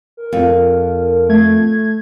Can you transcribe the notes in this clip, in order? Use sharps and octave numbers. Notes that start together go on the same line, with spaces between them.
A#4
F2
A3 G#6